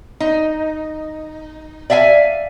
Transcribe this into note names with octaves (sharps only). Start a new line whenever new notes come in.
D#4
D5 E5 F5 G5 G#5